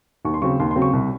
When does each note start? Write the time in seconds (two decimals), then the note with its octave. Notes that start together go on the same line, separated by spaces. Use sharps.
0.25 D#2 C#6
0.34 C6
0.42 C#3 F#3 C4 C#6
0.60 D#2 C6
0.71 C6
0.76 C#3 F#3 C4
0.82 C#6
0.93 C2